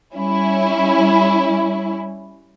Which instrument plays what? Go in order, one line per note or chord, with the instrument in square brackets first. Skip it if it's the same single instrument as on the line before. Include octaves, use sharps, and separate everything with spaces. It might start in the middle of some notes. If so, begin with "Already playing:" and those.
[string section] G3 C#4 E4